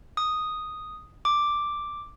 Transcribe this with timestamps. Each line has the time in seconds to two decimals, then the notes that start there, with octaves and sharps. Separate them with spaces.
0.17 D#6
1.25 D6